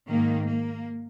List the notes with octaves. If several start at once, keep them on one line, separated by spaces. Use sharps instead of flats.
G#2 D#3 A#3
A#3